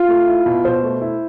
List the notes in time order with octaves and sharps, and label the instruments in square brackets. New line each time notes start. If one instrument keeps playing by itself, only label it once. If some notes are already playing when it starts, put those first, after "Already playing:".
Already playing: [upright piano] F4
[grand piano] A3
E4
B2
[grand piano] B2 [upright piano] C5
[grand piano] A3
E4